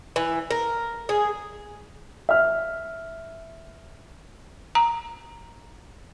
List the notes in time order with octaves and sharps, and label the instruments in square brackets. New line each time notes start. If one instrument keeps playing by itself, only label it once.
[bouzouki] E3
A#4
G#4
[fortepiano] E5 F6
[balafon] A#5